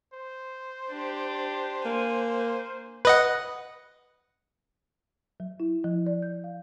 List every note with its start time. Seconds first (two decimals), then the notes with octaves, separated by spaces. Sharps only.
0.14 C5
0.90 D4 G4
1.85 A#3 G#5
3.05 B4 D#5 F#5
5.40 F#3
5.60 E4
5.84 F3
6.06 D5
6.22 G6
6.44 F5